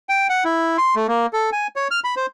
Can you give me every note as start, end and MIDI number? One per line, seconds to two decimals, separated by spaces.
0.09 0.27 79
0.29 0.44 78
0.45 0.77 64
0.78 0.95 84
0.96 1.07 57
1.08 1.26 58
1.33 1.50 69
1.53 1.67 80
1.76 1.88 73
1.91 2.00 89
2.04 2.15 83
2.17 2.26 72